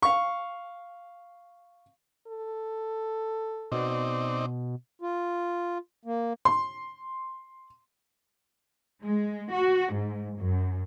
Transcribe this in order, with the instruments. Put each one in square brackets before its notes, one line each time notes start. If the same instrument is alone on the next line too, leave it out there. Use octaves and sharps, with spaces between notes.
[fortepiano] F5 C#6
[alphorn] A4
[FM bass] B2 [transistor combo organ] C4 D#4 D5
[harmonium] F4
A#3
[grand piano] C6
[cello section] G#3
F#4
G#2
F#2